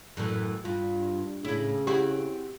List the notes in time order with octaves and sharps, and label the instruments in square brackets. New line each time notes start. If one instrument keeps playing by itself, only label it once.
[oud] F#2 A2 E3
[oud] G2 [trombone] F4
[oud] A2 E4 [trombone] C#3
[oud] C4 E4 F#4 [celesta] G4